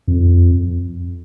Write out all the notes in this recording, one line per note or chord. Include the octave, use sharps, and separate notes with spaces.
F2